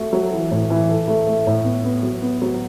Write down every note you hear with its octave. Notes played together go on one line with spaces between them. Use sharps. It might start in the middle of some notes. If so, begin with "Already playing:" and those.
Already playing: A3 F#4
F#3
E3
A2
E3
A4
A3
A3
A2
B3
B3
F#3
B3
F#3